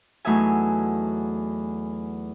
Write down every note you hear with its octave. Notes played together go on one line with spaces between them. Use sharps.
E2 F#3 A3 D#4 E5 G#5